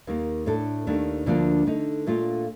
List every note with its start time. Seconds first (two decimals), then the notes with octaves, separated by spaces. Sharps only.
0.07 D#2 D#3 A#3
0.46 A2 A3 D4 A4
0.87 D#2 D#3 A3 D4
1.26 D2 D3 F3 A#3 D4
1.67 D3 A3 D#4
2.07 A#2 A3 D4 F4